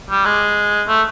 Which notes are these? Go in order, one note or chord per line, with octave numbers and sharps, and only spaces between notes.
G3
G#3
A3